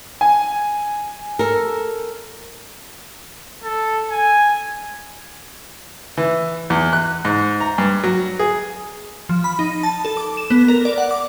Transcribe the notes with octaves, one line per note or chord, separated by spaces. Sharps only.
G#5
A4 A#4
A4
G#5
E3
E2
F#6
G#2
A#5
G2
F#3
G#4
F3
B5
D#4
A5
A4
D6
E7
B3
A#4
D5
F#5
D6